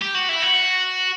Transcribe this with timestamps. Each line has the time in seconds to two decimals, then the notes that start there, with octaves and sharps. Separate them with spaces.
0.02 G4
0.15 F#4
0.29 E4
0.43 F#4